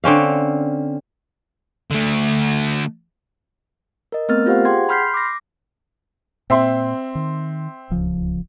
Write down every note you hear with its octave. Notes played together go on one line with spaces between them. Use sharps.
D3 C4 C#4 F5
D3 A3
A#4 D#5
A3 B3 C4 A#4 F6 A6
F4 G4 C5 F5 F#5
G#4 F#5 G5 C6 G#6
B5 C6 F6 G6 B6 C7
D6 A#6
A#2 C4 E5 C6
D#3
D1 C#2 F3